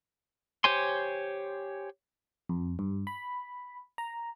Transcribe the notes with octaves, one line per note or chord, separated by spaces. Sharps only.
G4 C5 C#5 G#5 C6
F2
G2
B5
A#5